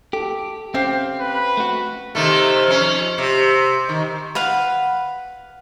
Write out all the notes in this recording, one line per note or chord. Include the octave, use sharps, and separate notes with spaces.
G4 A4
C4 C#4 G4 C5 F5 G5
B4
A3 F#4
C3 D#3 A3
F2 C#4
C3
D#3
B4 F5 F#5